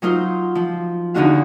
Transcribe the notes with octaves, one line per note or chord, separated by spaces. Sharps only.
F#3 D#4 F4 C5
F3
E2 D3 D#4 F#4 F5